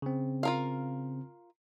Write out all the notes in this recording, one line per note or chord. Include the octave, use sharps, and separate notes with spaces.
C#3 C4
F4 A#4 F5